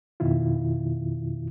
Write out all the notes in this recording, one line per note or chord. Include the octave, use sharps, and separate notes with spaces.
F2 B2 D#3 E4 F4